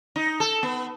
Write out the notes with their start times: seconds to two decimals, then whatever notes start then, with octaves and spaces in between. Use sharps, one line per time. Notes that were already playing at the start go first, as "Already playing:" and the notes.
0.16 D#4
0.40 A4
0.63 B3